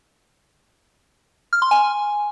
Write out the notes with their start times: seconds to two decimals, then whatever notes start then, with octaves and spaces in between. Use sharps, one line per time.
1.53 F6
1.62 C6
1.71 G#5